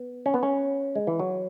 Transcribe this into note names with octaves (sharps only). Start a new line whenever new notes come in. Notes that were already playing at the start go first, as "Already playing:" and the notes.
Already playing: B3
C#4
B3
C#4
G#3
E3
F#3